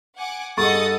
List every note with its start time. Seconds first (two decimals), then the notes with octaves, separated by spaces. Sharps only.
0.18 F#5 G#5 D6
0.57 G2 G#4 A4 D#5 F#5 C#6 D#6 A6